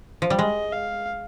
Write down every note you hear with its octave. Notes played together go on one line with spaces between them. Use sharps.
F3
G3
G#3 D#5
F5